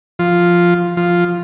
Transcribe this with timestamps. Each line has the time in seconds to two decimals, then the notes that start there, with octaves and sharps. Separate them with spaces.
0.19 F3 F4
0.97 F3 F4